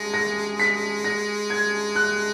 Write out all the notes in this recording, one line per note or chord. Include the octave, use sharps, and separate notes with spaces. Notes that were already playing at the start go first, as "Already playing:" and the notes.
Already playing: G#3 A#6
A#6
B6
A#6
G#6
F#6